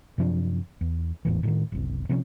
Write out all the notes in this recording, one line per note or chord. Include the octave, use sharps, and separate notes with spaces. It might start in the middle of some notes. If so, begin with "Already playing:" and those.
F#2 C3 F3 D4
E2
G#1 E2 A2 E3
A2 D3 D#3
F#1 C2
C3 F3 G#3 C#4